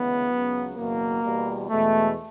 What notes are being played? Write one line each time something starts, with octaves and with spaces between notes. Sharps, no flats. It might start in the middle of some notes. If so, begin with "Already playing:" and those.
Already playing: D2 C#3 E3 G#3 B3
C#2 C#3 F#3
F#1 E2 B2 F#3 A#3
E2 B2 G3
E2 B2 G#3 A3